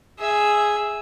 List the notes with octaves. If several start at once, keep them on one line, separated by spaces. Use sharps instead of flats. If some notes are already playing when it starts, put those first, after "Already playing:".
G#4 E5